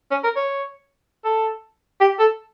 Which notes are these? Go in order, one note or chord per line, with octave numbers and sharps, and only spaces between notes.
C#4
A#4
C#5
A4
G4
A4